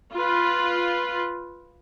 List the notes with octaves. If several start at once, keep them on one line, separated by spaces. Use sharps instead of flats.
F4 B4